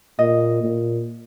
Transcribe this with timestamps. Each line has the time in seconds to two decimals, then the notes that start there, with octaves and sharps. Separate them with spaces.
0.19 A#2 D#5
0.63 A#2